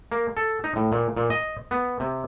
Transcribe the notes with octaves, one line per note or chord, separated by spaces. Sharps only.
A#3
A4
D#4
A2
A#2
A#2
D#5
B3
C3